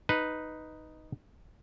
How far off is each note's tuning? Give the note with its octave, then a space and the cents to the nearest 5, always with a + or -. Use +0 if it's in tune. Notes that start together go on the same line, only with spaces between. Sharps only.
D#4 +0 B4 +0